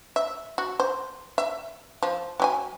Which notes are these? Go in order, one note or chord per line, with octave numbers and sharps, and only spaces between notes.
E5
F#4
C5
E5
F3
F#3 G4 G#5